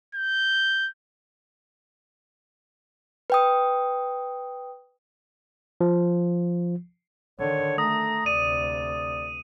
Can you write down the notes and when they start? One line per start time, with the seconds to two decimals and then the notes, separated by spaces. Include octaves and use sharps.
0.15 G6
3.30 B4 G5 D#6
5.81 F3
7.39 D3 D#3 C#5
7.78 A3 A#5 D#6
8.26 D2 C3 D5 D#7